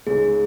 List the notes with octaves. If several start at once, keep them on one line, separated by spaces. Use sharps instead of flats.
C#2 C#3 G#3 D#4 G#4